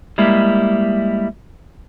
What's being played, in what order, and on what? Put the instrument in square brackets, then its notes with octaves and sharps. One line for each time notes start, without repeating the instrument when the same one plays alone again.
[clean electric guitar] G3 G#3 A#3 E4